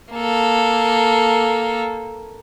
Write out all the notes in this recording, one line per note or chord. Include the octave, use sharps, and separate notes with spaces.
A#3 A4